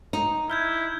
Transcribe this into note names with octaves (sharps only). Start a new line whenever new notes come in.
D#4
E4 F6 G6 G#6